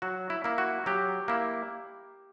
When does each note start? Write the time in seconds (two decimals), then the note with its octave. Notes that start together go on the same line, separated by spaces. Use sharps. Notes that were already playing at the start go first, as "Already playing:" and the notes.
0.02 F#3 F#4
0.30 E4
0.44 A#3 E4
0.58 F#4
0.86 F#3 G4
1.28 A#3 E4